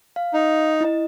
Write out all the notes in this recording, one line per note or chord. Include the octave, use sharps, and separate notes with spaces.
F5
D#4
E4 D#5